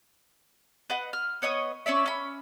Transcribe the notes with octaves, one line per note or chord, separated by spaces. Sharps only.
B4 D#5 F#5
F6
B3 C#5 D#5 D#6
C#4 C#5 D5 E5
C#4 B5